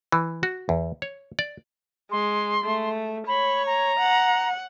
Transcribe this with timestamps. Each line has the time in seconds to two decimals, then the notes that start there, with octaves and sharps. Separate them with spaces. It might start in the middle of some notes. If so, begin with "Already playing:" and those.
0.12 E3
0.43 F#4
0.69 E2
1.02 C#5
1.39 D5
2.11 G#3 C6
2.64 A3
3.27 C#5 B5
3.66 A#5
3.99 F#5